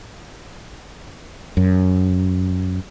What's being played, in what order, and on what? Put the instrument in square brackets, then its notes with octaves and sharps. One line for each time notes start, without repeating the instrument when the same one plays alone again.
[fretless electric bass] F#2